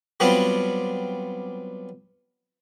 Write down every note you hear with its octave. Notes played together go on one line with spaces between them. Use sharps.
F#3 G3 B3 C4 D4 F4